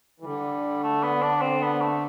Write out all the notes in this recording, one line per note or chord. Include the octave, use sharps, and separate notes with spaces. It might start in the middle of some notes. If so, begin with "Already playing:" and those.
E3
D3 G3
A3
B3
D4
C4
B3
A3